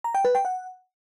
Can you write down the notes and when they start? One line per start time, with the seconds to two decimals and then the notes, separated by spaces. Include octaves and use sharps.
0.04 A#5
0.15 G5
0.25 B4
0.35 G5
0.45 F#5